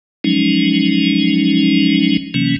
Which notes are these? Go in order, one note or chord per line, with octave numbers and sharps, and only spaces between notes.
F3 F#3 G#3 C#4 D#4
C3 E3 F#3 A#3 C#4